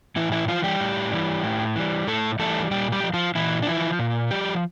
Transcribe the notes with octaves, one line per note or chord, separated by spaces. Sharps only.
A2 E3 E4
E3 E4
E3 F3 F4
G3 G4
A2
E3 G3
A2
E3 G3
A2 A3 A4
E3 G3 A3 A4
A#2 G3 G4
G3 G4
F3
F3 F4
A#2 E3 E4
D4
E3 F3 E4
A#2
F3 G3 G4